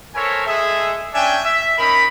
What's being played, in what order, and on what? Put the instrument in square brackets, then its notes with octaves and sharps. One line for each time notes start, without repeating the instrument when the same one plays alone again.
[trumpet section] A4 A#4 C5 C#5 E5 G#5
G#3 G#4 A4 E5
C#4 D4 E5 G5 G#5
E5
C#4 D#4 A#4 B5